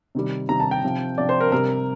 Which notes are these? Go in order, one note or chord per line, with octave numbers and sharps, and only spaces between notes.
C3 D#3 G3
C3 D#3 G3 A#5
A5
G5
C3 F3
C3 F3 D5
C5
A#4
C3 G3 A#4